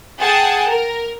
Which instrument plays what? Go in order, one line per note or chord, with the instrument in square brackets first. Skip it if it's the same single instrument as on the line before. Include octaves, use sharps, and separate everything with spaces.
[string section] G#4 F#5 G5 A5
A#4